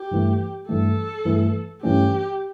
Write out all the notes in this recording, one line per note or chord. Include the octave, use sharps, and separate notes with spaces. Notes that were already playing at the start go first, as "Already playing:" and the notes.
Already playing: G4
G2 E3 A3
G2 E3 A3 A4
G2 E3 A3
G2 E3 A3 C#4 G4